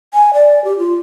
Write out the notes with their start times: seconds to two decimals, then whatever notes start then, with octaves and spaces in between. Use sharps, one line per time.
0.14 G#5
0.34 D5
0.64 G4
0.78 F4